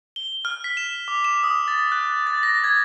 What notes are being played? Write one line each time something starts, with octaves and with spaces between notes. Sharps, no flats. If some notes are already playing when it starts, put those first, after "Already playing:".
G7
F6
B6
E7
D6
E7
D#6
A6
F#6
A6
A#6
G#6